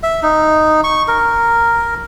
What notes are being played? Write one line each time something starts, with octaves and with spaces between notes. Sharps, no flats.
E5
D#4
C#6
A#4